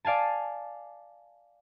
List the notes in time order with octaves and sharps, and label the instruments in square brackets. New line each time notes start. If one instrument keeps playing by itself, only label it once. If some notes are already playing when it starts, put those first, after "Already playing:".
[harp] D5 F5 G#5 A5